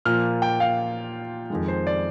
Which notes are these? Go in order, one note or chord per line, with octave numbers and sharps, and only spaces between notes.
A#2 F3 A#3 F6
G5
F5
F2 D#3 G#3
C5
D5